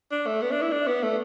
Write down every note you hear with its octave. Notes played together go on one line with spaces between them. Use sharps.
D4
A3
B3
D4
E4
D4
B3
A3